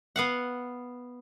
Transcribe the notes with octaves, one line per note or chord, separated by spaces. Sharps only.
B3 F5 F#5